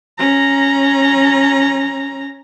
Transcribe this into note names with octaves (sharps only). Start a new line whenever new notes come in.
C#4 A#5